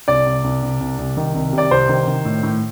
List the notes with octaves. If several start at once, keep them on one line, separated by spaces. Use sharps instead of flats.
C2 D5
C2
C2
C2
C2
C2
D#3
C2
C3 D5
C2 C5
D#3
D#3
A2
A2